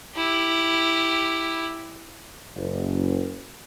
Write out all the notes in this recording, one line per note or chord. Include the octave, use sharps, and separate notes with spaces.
E4 G4
F#1